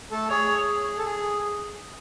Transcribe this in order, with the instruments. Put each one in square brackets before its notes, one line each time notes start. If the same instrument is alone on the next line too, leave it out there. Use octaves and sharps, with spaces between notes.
[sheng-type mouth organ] A3 A4
[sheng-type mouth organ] G#4 [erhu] C#5
[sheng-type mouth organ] A4
G#4